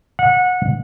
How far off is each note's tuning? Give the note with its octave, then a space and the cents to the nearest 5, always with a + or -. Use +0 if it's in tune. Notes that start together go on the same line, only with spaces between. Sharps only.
F#5 -25